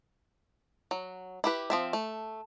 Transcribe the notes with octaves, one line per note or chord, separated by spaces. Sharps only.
F#3
E4 G4 B4
F3 C4 E5
A3